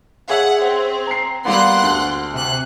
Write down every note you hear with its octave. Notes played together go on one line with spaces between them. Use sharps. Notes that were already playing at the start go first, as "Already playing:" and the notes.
G#4 C#5 E5 F#5
C4
A#5 C7
G3 A#3 B3 F#5 C6 F#6
D2
C3 F#6